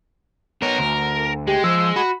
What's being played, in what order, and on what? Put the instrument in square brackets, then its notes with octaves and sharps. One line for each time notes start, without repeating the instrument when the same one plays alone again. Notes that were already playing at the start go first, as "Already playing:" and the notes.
[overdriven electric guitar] B3 C#5 [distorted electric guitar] A#4
[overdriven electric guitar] D2
[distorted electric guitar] G#3 [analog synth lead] G4
[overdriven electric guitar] F3 [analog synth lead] E6
[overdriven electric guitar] F#4 [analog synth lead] B5